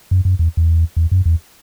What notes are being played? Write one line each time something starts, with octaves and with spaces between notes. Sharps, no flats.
F#2
F#2
E2
E2
E2
F#2
E2